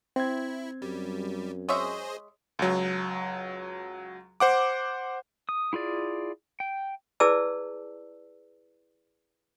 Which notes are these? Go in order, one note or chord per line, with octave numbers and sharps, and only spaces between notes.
C4 E4 G#6
F#2 G3
G#3 G#4 C5 C#5 D#5 E5
C#2 F#3
C5 F#5 D6
D#6
E4 F4 G#4 D5
G5
E4 G#4 B4 D5 A5 E6